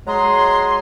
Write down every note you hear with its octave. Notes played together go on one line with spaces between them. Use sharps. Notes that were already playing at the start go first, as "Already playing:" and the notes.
F#3 G#3 G#4 A#5 C6